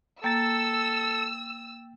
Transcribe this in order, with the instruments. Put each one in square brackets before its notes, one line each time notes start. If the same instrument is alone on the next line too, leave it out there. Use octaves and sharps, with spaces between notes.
[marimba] A#3 [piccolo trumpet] A4 [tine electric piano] G5 A6 [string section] E6